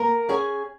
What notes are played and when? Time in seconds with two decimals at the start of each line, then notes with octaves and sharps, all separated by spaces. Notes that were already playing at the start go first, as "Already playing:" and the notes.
Already playing: A#3 A#4 A#5
0.29 C#4 G#4 G#5